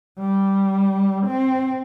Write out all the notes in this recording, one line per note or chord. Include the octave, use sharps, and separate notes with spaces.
G3
C4